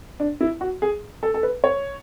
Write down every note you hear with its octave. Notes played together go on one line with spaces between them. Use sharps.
D4
E4
F#4
G#4
A4
A4
B4
C#5